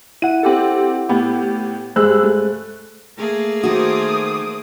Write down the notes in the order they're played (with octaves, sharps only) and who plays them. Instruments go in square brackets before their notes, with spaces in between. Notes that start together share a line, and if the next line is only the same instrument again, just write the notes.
[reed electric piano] E4 F#5 [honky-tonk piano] D#7
[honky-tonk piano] C4 G4 A4
A2 B3 G4
[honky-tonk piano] G2 E6 F#6 [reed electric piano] G#3 G#4 C5
[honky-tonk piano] A3
[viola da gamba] A3 A#3 G#4
[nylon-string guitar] D#3 F#4 [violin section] C5 D6 D#6